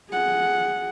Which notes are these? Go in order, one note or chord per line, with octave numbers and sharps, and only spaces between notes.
G#4 F#5